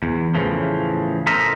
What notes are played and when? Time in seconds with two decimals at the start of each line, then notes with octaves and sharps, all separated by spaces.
0.03 E2
0.35 A2 C#3 E3 F3
1.27 A4 A#4 C5 D#5 E5